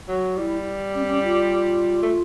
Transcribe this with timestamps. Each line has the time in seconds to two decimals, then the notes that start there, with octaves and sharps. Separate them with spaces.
0.08 F#3
0.37 G3 E4
0.95 C#4
1.02 C4
1.09 C#4
1.24 F4
2.03 A3